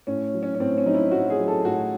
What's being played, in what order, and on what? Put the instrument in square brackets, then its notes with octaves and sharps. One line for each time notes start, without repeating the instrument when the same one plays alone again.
[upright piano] A2 C#4
F#3
C#4
C#4
A2 C4
C#4
F#3 D#4
E4
A2 F#4
G#4
F#3
A4
A2 F#4